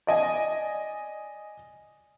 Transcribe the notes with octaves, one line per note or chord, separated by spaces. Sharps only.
D5 D#5 G#5